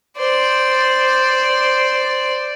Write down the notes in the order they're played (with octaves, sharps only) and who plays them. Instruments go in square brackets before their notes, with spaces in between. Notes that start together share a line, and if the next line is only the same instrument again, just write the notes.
[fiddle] C5 D5